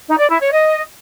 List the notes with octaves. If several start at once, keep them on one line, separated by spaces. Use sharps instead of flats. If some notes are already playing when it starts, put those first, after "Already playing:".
D#4
D5
E4
C#5
D#5